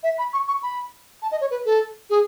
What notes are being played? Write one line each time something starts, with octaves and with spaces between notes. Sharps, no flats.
E5
B5
C#6
C#6
B5
A5
D#5
C#5
B4
A4
G#4